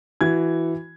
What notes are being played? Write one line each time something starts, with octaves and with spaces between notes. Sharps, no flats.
E3 F#4 G#6